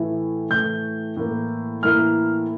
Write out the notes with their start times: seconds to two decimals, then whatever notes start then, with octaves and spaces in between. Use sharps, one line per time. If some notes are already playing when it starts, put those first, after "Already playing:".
Already playing: A2 E3 A3
0.50 A2 E3 A3 G6
1.16 A2 E3 A#3 E4
1.83 A2 E3 A#3 E4 F6